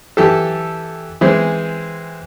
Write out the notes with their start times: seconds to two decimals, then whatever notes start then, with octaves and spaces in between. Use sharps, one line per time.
0.17 E3 G4 A4
1.21 E3 G#3 C4